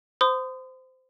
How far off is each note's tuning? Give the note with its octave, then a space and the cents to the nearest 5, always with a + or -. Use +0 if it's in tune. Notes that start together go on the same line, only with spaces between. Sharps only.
C5 -20 C6 -45 D#6 -15